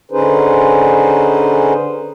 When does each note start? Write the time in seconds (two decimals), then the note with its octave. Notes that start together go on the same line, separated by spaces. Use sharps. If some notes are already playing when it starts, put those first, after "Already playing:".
0.12 D3 C#4 D#4 G#4 B4 C5